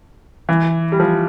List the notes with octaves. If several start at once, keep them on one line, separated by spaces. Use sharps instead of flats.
E3
G3
F3